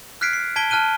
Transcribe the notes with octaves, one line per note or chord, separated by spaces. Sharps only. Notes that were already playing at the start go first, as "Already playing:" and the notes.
F6 F#6 G#6 B6 C7 D7
C7
A5 G#6 B6 D7 G7
A5 F6 F#6 D#7 G7